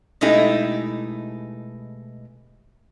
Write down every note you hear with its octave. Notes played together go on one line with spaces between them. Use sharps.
B2 G#3 A3 D#4 E4 G4